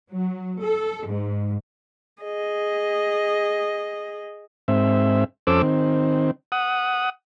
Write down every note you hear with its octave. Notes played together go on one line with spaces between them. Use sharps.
F#3
A4
G#2
G#4 D#5
G#2 C4 E5
F2 C#4 A4 C5 D6 E6
D#3 C4
F#5 D#6